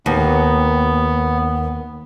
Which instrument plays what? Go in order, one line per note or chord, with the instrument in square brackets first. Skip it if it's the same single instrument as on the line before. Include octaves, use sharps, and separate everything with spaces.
[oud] D#2 [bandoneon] B3